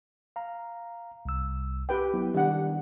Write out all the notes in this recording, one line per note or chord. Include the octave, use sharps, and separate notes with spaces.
F5 A#5
C2 E6
G4 B4 G5
F#3 B3 E4
D#3 G3 D4 F#5